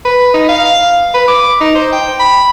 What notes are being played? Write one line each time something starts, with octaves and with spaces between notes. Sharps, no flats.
B4
D#4
F5
B4
D6
D#4
C5
G5
B5